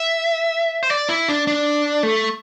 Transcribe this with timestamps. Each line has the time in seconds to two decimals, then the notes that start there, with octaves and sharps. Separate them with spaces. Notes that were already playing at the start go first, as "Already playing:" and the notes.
Already playing: E5
0.83 C5
0.90 D5
1.09 E4
1.28 D4
1.47 D4
2.03 A3